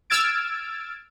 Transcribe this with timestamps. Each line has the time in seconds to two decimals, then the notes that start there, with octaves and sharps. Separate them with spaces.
0.10 E6 F6 G#6 A6 D7